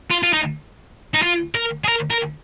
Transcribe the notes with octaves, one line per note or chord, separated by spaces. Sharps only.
F4
F4
D#4
D#4
F4
A#4
G#4
A#4
A#4